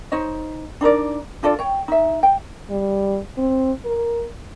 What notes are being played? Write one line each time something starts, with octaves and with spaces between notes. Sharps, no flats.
D#4 C5 C#5 D#5
D4 D#4 A#4 D5
D4 F4 A4 D5
C#5 G5
D#4 E5
G5
G3
C4
A#4